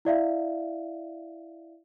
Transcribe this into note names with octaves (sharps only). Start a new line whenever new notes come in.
E4 D5 E5 F5